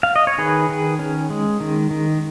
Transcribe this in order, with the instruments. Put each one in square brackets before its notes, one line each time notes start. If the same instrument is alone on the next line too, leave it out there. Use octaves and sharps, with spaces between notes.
[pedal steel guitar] F5
D#5
C#5
D#3 G#4 B4
D#3
C#4
G#3
D#3
D#3